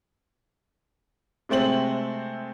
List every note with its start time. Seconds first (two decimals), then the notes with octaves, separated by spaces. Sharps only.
1.49 C3 G#3 A3 C4 F#7